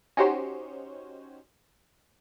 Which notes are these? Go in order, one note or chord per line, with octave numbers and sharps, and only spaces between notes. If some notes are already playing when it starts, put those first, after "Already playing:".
C#4 D#4 F#4 G4 C5 C#5